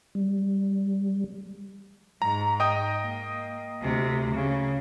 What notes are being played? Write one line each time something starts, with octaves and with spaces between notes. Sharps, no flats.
G3
G#2 A#5
D#5 G5 D#6
A#3
D2 C3
C#3